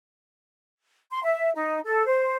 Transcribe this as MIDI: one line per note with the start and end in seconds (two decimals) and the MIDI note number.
1.11 1.20 84
1.23 1.50 76
1.55 1.79 63
1.85 2.06 69
2.06 2.37 72